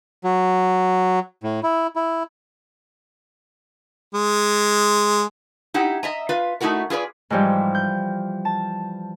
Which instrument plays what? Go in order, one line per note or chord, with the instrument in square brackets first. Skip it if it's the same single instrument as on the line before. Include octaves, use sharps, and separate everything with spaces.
[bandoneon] F#3
A2
E4
E4
[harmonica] G#3
[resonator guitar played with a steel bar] D#4 E4 G4 F#5
D#5 E5 A#5
F4 B4 F5
A3 D#4 E4 F#4 A#4
F4 G#4 B4 D5
[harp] G#2 E3 F3 G3 G#3
G6
A5